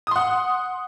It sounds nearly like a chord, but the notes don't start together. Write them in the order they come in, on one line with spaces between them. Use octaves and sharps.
D#6 C6 F#5